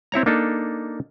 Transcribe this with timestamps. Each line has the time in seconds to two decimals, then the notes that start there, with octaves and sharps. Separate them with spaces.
0.12 C4 E4 C#5 A#5
0.26 A#3 D4 D#4 A4